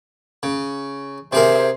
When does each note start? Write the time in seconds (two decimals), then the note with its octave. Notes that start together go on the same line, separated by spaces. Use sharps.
0.43 C#3
1.33 C3 G#4 A#4 C5 E5